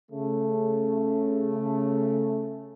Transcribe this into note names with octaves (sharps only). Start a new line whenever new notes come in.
C#3 A3